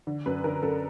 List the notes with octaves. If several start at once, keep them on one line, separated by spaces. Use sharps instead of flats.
D3
F#2 B4
D3 A#4
F#2 A4